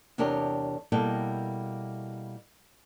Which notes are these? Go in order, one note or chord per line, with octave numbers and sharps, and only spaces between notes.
E2 C3 D4 G4 A#4 C#5
B2 G3 A#3 E4 A4 G5